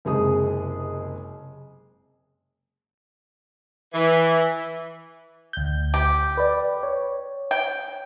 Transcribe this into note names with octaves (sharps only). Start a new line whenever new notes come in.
F#1 C3 G#3 G#4 D#6
E3
D2 G6
G4
B4 D5
C#5
G5